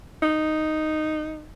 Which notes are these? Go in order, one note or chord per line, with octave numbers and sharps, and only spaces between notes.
D#4